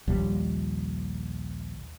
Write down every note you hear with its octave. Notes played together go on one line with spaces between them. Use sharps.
A#1 D#2 G3